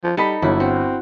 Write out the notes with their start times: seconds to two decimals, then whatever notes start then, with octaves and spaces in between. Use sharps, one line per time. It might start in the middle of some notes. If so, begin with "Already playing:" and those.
0.04 F3
0.17 G3 D#4 A4 D#5 B5
0.42 G1 F#3 E4
0.60 C4 F#4